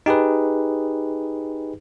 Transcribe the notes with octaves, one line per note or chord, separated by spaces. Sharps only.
D#4 G4 G#4 B4